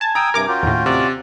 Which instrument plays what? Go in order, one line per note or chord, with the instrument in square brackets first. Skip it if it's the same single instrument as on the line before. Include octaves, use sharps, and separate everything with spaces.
[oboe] G#5 [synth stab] A5
[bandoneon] G5 D#6 E6 [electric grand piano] A#5 D7
[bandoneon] G2 C3 [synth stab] A#4 D6
[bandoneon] C#4 F4 F#4 [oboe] G5
[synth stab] D#2 A2
[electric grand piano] C3 [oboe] D5